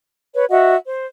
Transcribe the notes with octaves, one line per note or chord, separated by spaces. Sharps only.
B4 C#5
F#4 D#5 E5 F#5
C5